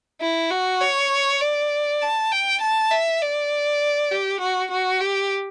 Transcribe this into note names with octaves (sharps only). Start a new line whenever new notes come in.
E4
F#4
C#5
D5
A5
G5
A5
E5
D5
G4
F#4
F#4
G4